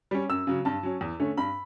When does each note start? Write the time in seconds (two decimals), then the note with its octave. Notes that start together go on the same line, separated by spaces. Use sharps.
0.11 G3 C#4
0.29 F#2 E6
0.47 C#3 F#3
0.65 G2 A5
0.83 F#3 C#4
1.01 E2
1.20 D3 A3 C#4
1.37 G2 B5